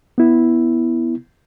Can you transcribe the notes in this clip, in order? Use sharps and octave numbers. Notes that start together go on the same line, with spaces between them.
B3 E4